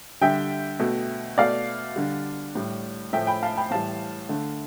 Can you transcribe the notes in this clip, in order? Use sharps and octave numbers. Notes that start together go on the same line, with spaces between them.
D3 G3 E5 G5
B2 A3
B2 A3 D5 F5
D3 G3
A2 G3
A2 F3 A3 E5 G5
G5 B5
F5 A5
G5 B5
A2 E3 G3 F5 A5
D3 A3